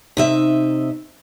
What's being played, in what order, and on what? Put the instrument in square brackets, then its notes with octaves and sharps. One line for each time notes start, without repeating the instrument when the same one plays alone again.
[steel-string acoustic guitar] C3 D#4 E5